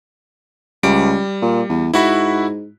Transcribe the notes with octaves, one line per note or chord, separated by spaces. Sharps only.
C#2 G3 D7
A#2
E2
G#2 E4 F#4 B5